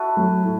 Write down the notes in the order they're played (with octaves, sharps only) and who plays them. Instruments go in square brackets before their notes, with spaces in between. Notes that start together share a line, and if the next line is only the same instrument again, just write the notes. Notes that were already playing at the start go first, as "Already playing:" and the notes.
Already playing: [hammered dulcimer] E4 F#4 A4 B4
[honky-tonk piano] F#3 A3
A2